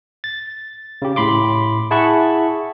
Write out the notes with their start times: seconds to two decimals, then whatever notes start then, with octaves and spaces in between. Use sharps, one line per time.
0.24 A6
1.02 C#3 G4
1.16 A2 B5 C6 D6
1.91 E4 G#4 F#5 A5 B5 C#6